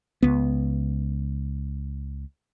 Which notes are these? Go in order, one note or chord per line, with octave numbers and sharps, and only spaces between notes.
C#2 B3